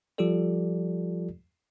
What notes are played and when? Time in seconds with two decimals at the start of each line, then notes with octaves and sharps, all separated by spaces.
0.18 F3 G3 F4 G4 A4 D5